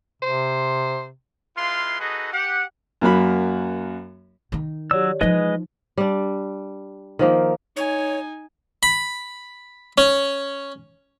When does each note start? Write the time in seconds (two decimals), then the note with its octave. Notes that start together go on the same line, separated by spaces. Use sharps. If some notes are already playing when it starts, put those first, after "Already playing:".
0.22 C3 C5
1.57 G#3 E4 F4 B4 F5 C6
2.00 D#4 F#4 G#4 A4 B4 D#5
2.33 G4 F#5
3.01 F#2 A#3 F#4 B5
4.52 D#3 D#4
4.91 F#3 G4 C#5 D5 E6
5.21 E3 F3 G#3 D#4 B4 D#5
5.98 G3 D4
7.19 D#3 F3 A#3
7.77 D#4 C#5 G#5
8.83 B5
9.98 C#4